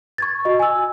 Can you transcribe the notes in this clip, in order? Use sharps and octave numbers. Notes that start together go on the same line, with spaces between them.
C#6 G#6 A6
F#4 D#5
G#5 E6